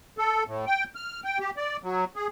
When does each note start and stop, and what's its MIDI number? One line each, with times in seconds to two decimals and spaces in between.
0.18 0.44 69
0.47 0.65 45
0.67 0.84 79
0.95 1.21 89
1.24 1.39 79
1.39 1.50 67
1.57 1.77 74
1.83 2.05 54
2.16 2.27 68